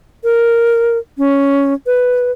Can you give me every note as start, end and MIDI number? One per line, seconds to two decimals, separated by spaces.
0.24 0.98 70
1.18 1.74 61
1.86 2.31 71